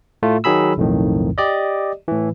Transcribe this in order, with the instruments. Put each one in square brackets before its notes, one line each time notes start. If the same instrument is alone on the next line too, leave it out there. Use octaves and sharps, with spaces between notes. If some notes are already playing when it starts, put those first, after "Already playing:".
[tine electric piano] A2 A3 F4
D#3 F#3 G#4 B5 E6
B1 F2 A2 D#3
G4 D5 D#5
A2 E3